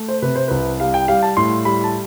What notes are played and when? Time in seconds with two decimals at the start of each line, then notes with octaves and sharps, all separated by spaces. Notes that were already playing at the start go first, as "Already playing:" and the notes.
Already playing: A3
0.08 C5
0.22 C3 B4
0.36 C5
0.48 C2 B4
0.80 G3 F5
0.94 G5
1.08 G3 F5
1.22 A5
1.37 A2 C6
1.65 G3 B5
1.84 A5